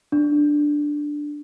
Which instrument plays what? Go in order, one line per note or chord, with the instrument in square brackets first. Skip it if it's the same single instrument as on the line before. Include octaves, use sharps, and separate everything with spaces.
[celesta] D4